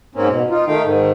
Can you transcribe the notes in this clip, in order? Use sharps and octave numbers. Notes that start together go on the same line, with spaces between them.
G#2 A#3 C4 C#4
B2
D#4 F4
D#3 A3 D#4 F5 G5
G#2 D#3